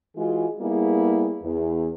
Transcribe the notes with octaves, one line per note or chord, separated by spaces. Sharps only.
E3 G#3 F4 F#4 G#4
G3 A#3 B3 E4 G#4
E2